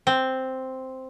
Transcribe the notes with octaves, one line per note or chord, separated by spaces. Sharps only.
C4